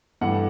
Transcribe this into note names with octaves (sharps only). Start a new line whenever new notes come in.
G2 E3 A3 F#5